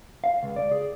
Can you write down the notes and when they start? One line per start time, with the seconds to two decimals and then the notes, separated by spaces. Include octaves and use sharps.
0.24 F5
0.43 C#2
0.56 D5
0.71 G#4